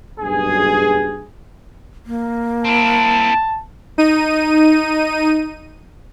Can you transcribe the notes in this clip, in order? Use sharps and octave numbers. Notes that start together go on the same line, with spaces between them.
F#1 B1 G2 G#4
A#3
C4 E4 A5
D#4 D#7